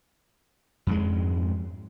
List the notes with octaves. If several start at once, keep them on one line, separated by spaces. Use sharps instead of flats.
F2 G#2 G#3